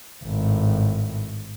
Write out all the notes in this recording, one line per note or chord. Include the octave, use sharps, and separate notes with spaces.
G#1 A2